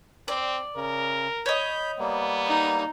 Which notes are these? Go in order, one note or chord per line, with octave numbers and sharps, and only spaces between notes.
C4 D5
C#3 A#4
C#5 D#5 B5 G6
G3 A#3 B3
D#4